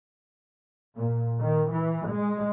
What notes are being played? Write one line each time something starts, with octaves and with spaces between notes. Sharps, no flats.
A#2
D#3
E3
G#3